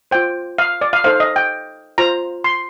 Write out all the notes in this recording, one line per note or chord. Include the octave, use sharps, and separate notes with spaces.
F4 C5 G5
F5
D5
F5
D#4 A4 C5 F5
D#5
G5
F4 C5 A#5
C6